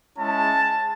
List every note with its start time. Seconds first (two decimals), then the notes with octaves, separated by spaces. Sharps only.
0.18 G#3 C#4 E4 A5